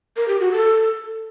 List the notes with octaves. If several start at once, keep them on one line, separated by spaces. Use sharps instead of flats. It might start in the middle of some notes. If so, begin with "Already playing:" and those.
A#4
G4
F#4
A4